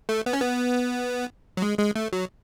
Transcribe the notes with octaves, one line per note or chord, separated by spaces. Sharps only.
A3
B3
C#4
B3
F#3
G#3
G#3
A3
F#3